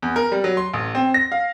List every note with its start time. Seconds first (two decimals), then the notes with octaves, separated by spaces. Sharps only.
0.03 E2
0.16 A#4
0.32 G3
0.44 F#3
0.57 C6
0.73 A1
0.95 C4
1.14 A#6
1.32 F5